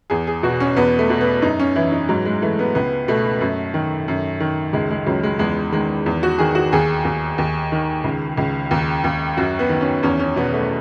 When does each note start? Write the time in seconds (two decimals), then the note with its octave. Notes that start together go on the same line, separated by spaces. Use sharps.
0.10 E2 G#4
0.27 G#4
0.43 B2 F#4
0.60 C#4
0.77 E2 B3
0.99 A3
1.10 B2
1.21 B3
1.42 F#2 D#4
1.59 C#4
1.76 E3 E4
1.92 D#4
2.09 G#2 F#3
2.25 G#3
2.42 E3 A3
2.59 B3
2.75 C#2 B3
3.08 B2 A3
3.41 F#2
3.74 D#3
4.08 F#2
4.40 D#3
4.73 C#2 G#3
4.91 G#3
5.06 C#2 F#3
5.23 G#3
5.39 E2 G#3
5.72 D#3 G#3
6.06 E2
6.23 F#4
6.38 D#3 G#4
6.55 F#4
6.72 D#2 G#4
7.05 D#2
7.38 D#2
7.72 D#3
8.04 C#2
8.37 C#2
8.71 D#2
9.04 D#2
9.37 F#2 F#4
9.59 B3
9.70 D#3
9.81 C#4
10.03 E2 C#4
10.19 C#4
10.36 B2 B3
10.53 A3